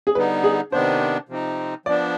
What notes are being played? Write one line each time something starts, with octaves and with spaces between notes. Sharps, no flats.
G#4
D3 G3 B3 D#4 B4
G#4
C3 D#3 B3 D4 C5
C3 F3 C4 D#4
F3 B3 D4 D5